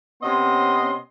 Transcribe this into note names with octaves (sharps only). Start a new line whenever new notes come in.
C3 B3 C#4 D#5 C6